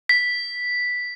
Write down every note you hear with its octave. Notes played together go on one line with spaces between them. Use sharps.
B6